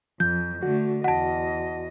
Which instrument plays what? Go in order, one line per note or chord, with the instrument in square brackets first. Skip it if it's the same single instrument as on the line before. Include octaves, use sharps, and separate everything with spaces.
[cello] F2 [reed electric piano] F3 [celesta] G6
[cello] D3 A3 [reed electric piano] F#4
[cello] E2 D#5 [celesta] F#5 A5